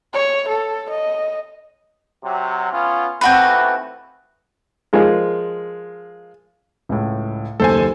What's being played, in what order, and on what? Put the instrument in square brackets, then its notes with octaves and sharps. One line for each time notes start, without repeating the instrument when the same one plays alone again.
[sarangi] C#5
A4
D#5
[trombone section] C3 F#3
B3 C#4 F4
[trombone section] D#2 E3 A3 [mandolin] C4 F#4 B4
[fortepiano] F3 G#3 F4 A#4
[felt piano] C#2 A2
[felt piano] F#1 D#2 [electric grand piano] A4 C5 G#5